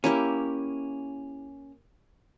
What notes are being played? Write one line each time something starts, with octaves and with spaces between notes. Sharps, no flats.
A#3 C#4 E4 G4